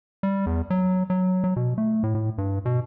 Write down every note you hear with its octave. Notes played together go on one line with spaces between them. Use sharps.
G3
E2
F#3
F#3
F#3
B2
A3
A2
A2
G2
B2